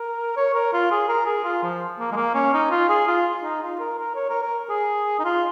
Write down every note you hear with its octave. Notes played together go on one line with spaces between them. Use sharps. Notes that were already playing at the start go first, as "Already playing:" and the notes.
Already playing: A#4
C#5
A#4
F4
G#4
A#4
G#4
F4
F3
A#3
G#3
A#3
C#4
D#4
F4
G#4
F4
D#4
F4
A#4
A#4
C#5
A#4
A#4
G#4
D#4
F4